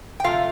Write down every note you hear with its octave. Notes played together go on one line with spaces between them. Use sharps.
G5
C3 F3 A3 F4 F5